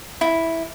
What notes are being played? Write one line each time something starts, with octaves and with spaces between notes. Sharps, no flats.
E4